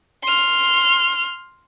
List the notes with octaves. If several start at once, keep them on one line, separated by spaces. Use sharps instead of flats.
C6 F6